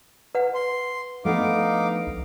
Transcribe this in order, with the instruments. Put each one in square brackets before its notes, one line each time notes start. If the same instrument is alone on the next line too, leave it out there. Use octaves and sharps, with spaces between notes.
[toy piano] B4 F#5
[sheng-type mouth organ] C6
[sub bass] F3 [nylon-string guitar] A3 B3 D4 [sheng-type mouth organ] D#4 F5 D6
[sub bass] C2